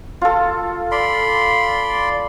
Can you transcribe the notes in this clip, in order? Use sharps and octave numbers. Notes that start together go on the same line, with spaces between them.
F4 A4
D5 B5 C6